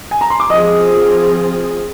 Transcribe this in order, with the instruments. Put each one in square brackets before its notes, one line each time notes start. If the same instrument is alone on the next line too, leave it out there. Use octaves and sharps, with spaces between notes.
[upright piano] G#5
A#5
C6
D6
[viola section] F3 C4 F4 G#4 [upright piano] D#5 D#6